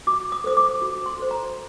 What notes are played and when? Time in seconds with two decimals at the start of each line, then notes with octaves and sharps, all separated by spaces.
0.07 F#4 D6
0.32 D#6
0.44 A4 C5 D#6
0.57 D6
0.82 F#4
1.06 C6
1.19 A4 C5
1.31 A#5